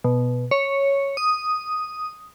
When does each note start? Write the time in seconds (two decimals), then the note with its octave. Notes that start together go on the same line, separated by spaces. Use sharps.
0.04 B2
0.51 C#5
1.17 D#6